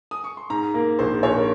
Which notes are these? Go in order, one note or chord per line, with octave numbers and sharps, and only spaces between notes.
D#6
C#6
C6
G#2 A#5
A#3
A#1 C5
A#1 C#5
A#4